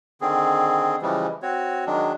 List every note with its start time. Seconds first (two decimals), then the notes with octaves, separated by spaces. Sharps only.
0.21 D3 D#3 C4 G#4
1.02 C#3 E3 F3 G3 G#3
1.42 C4 F#4 C#5
1.86 D#3 F#3 G#3 D4